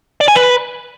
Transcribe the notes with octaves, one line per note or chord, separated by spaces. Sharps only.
D5
G#5
B4